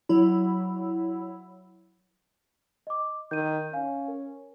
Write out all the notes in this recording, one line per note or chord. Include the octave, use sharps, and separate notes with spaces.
F#3 E4
D#5 D6
D#3 G6 D#7
C#4 F5 G#5
A#4